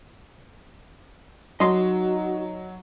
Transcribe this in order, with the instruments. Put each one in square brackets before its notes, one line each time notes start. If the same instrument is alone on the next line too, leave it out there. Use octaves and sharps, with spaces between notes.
[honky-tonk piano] F#3 [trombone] D#4 [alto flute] F#4 [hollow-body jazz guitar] D#5 C6